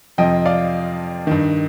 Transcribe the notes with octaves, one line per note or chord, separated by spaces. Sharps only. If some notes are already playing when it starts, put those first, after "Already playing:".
F2 C3 F3 D#5 G5
D5 F5
G2 D#3